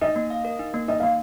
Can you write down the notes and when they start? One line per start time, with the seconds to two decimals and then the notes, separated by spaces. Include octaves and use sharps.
0.01 D#4 D#5
0.16 A#3
0.30 F5
0.45 A#4
0.59 D#4
0.74 A#3
0.88 D#4 D#5
1.00 A#3 F5